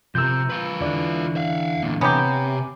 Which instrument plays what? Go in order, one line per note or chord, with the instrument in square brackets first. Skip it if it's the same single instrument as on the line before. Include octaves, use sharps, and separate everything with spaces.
[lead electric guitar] C3 [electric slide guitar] F3 A#4 [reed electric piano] E6 G6
[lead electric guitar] F4 B4
[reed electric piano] E2 D5 [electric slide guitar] D3 E3
[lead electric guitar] E5 F5
E2 A#2
[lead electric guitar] C3 [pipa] B3 G4 [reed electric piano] C#5 G#5 A#5